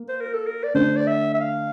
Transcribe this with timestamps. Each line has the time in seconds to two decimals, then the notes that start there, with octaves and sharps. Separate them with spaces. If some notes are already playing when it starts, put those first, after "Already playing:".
Already playing: A#3
0.09 C5
0.21 A#4
0.33 A4
0.46 A#4
0.63 D5
0.74 D3 A3 D4 C5
0.96 D5
1.07 E5
1.34 E5
1.40 F5